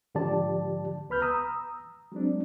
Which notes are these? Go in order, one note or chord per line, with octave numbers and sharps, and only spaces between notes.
G#2 D3 F3 G4 D5 A5
C#2 B3 B4 B5 F6 G6
A#5 D#6 E6
F#3 G#3 C4 D4